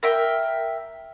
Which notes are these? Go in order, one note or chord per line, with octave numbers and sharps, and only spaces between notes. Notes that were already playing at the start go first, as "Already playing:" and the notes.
A#4 E5 G5